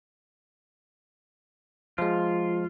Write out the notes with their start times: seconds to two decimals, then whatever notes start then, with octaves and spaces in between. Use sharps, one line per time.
1.98 F3 G#3 F4